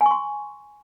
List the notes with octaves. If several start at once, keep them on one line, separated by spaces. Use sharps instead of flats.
G#5
C#6
C6